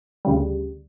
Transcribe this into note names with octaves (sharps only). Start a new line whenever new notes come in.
D2 C#3 G3